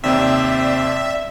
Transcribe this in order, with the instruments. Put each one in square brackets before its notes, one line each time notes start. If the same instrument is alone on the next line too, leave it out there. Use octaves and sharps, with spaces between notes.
[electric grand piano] D#2 C3 [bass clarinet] C4 [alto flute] D5 [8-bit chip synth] E5